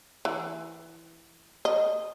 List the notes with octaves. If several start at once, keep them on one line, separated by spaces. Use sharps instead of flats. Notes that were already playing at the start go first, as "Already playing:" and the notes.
E3
D#5